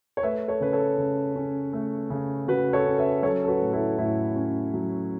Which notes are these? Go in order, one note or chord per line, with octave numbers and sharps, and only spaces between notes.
C#5
A3 B4 E5
A4 C#5
C#3 B4
A4 C#5
C#3
C#4
A3
C#3
C#3 F#4 B4
A4 C#5
C#4
B4 E5
F#3 A4 C#5
A4
F#4 B4
A2
E4 A4
A2 E4
C#4
F#3